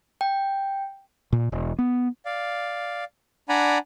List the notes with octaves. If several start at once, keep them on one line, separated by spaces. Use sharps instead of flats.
G5
A#2
E1
B3
D5 F5
D4 D5 F#5 G#5 A#5 B5